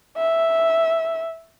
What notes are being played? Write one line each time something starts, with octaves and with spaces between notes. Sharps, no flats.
E5